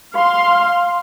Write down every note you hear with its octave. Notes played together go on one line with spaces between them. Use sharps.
F5 C6